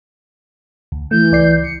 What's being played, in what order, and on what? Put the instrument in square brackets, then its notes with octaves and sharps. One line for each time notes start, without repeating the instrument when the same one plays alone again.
[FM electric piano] D2
[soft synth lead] E3 [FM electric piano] A3 [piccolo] G6
[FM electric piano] C#2 D5 C7
[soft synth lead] C#7